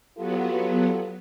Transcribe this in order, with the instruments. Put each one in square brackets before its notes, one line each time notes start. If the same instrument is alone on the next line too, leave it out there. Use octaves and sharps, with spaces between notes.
[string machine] F#3 B3 [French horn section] F4 G4 A4